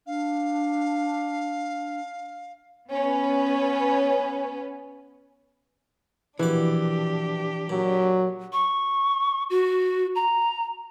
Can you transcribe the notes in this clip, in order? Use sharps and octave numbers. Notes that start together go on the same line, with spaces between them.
D4 F5
B3 C#4 B4
A#1 B2 E3 D4 G4 D6
A#2 F#3
C#6
F#4
A#5